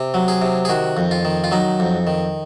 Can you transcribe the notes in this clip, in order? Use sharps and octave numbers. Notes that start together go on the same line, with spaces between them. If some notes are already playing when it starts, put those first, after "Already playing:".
Already playing: C3
F#3
G#4
C3
G#4
D#3 F#4
F2
F4
D#3
F4
F#3 D#4
F2
D#3